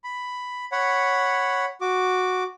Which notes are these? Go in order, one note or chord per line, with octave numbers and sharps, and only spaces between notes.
B5
C#5 F#5 B5
F#4 D6